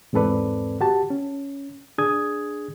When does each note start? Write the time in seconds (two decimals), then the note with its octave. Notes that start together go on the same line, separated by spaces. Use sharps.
0.13 E2 G#2 C4 A4 B4 D5
0.81 F#4 G4 A5
1.10 C#4
1.98 D4 G#4 D#6 G#6